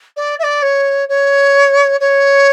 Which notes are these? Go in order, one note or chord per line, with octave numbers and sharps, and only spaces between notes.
D5
E5
D5
C#5
C#5
C#5